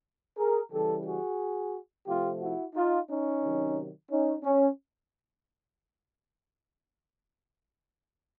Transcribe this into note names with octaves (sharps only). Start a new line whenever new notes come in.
G#4 A#4
C#3 E3 G3 G4 A4
F#4 G#4
C3 F3 A3 C4 F4 G4
E4 F#4
D#4 F4
C#4 D#4
C3 D#3 F#3
C#4 D#4
C#4